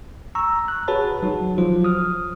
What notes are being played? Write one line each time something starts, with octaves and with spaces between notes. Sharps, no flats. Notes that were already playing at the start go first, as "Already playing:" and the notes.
A#5 C#6 E6
F#6
F#4 G#4 B4 C#5 A5 B5
F#3 D#4 F#4
F3 F#3 F4 C5
D#6 F6